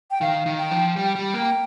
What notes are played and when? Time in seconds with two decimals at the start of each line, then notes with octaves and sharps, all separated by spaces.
0.11 G5
0.21 D#3 F5
0.46 D#3
0.59 G5
0.71 F3
0.96 G3 G5
1.15 G3
1.34 A#3